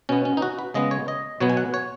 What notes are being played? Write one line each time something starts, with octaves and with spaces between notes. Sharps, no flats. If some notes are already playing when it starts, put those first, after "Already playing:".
B2 B3 C#4
C#4
D#4
F#4
B4
C#3 G#3 B3 D#5
C#5
D#5
B2 F#3 B3 C#5
G#5
F#5
C#5